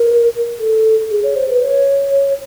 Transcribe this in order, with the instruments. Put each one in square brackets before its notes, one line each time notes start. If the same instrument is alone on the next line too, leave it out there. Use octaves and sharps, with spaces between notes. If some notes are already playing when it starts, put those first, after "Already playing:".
Already playing: [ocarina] A#4
A4
G#4
C#5
C5
B4
C#5